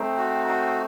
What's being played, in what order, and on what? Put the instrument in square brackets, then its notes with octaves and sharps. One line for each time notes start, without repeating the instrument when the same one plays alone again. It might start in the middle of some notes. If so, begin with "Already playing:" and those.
Already playing: [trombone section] A3 C4 [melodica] D#4
[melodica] F#4
D#4